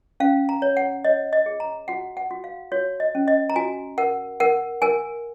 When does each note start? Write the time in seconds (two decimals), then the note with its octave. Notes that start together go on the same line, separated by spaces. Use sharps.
0.20 C#4 F5
0.49 A#5
0.62 C#5
0.77 F#5
1.05 C#5 D#5
1.33 D#5
1.46 G#4
1.60 A#5
1.88 F#4 F#5
2.17 F#5
2.31 F#4
2.44 F5
2.72 F#4 C#5
3.00 D#5
3.15 C#4
3.28 D#5
3.50 A#5
3.56 F#4 G#5
3.98 A#4 F#5
4.40 A#4 F#5
4.82 A#4 G#5